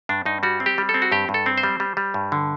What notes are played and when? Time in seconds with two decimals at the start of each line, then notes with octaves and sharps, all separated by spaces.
0.09 G2 D4
0.25 G2 D#4
0.43 G3 F#4
0.60 C4
0.66 G4
0.78 G3
0.89 A4
0.94 C4
1.02 F#4
1.12 G2 G4
1.29 G2
1.34 A4
1.46 C4
1.58 C5
1.63 G3
1.80 G3
1.97 G3
2.14 G2
2.32 D3